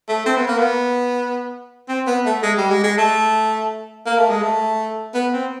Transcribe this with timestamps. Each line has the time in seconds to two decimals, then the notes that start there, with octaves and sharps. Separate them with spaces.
0.09 A3
0.26 C4
0.37 B3
0.48 A#3
0.59 B3
1.89 C4
2.07 B3
2.26 A3
2.43 G#3
2.57 G3
2.70 G#3
2.84 G#3
2.98 A3
4.06 A#3
4.18 A3
4.30 G#3
4.42 A3
5.14 B3
5.33 C4